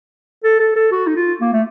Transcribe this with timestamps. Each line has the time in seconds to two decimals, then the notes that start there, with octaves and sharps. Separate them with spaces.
0.44 A4
0.60 A4
0.76 A4
0.92 F#4
1.07 D#4
1.16 F4
1.41 A#3
1.53 A3